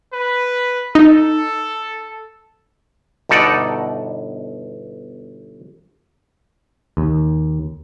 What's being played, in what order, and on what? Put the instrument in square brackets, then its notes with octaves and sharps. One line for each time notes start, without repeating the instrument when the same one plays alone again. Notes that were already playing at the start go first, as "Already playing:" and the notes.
[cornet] B4
[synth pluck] D#4 [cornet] A4
[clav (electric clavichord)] G1 B2 D#4 A4 D5 F#5
D#2